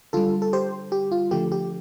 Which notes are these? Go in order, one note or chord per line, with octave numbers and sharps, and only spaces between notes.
D3 G3 F4 A4
A4
G4 C5
G4
F4
D3 F3 A3 G4
G4